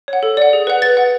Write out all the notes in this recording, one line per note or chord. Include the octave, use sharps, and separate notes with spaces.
C#5 F#5
A4
D5 F#5
G#4
B4 F#5
B4 A6
F#5